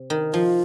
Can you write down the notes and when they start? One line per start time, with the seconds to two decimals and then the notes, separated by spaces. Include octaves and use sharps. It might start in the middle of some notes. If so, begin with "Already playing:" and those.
Already playing: C3
0.10 D#3
0.33 F3 F4